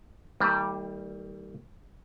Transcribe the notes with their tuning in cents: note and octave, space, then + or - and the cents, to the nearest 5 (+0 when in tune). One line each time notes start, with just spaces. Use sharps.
D#3 +35 G3 +0 A#3 -45